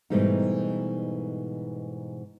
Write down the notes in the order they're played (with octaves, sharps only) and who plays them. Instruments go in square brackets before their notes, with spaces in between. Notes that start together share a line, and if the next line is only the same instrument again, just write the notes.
[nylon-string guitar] G#2 B2 E3 G3 A3 D#4